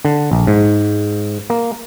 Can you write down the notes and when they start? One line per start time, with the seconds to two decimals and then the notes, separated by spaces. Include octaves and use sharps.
0.05 D3
0.32 A#1
0.47 G#2
1.50 A#3